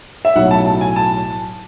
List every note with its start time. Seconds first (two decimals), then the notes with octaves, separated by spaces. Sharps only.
0.25 E5
0.35 B1 A2 F#3 F#5
0.51 A5
0.66 A5
0.81 G#5
0.96 A5